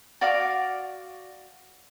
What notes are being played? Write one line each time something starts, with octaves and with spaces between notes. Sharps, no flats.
F#4 D5 F5 D6